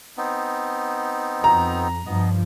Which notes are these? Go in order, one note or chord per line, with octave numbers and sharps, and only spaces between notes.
B3 C4 D#4
F2 A#5
G2 F3 B3 D#5